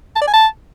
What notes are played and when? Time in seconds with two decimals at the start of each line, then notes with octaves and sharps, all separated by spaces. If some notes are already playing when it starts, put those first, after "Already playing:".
0.16 A5
0.22 D5
0.27 G#5
0.33 A5